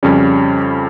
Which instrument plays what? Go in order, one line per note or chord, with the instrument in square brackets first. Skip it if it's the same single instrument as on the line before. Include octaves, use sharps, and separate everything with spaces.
[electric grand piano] F2 C#3 G3 C#4